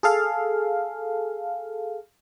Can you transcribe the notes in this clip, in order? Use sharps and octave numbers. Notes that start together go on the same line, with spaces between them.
G#4 A4 F5